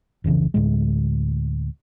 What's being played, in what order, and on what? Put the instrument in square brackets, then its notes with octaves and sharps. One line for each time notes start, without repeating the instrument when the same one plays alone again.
[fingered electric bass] F1 C#2 C#3 E3
D2 A2 G#3